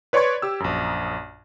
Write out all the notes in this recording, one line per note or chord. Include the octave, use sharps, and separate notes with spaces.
B4 C#5 D5 C6 C#6 G#6
G4 E6
A#1 F#2